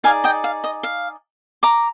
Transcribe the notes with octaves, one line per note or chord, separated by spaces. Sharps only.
D#4 G#4 D5 F5 G#5
D#5 G5
F5
D#5
F5
A#5 D6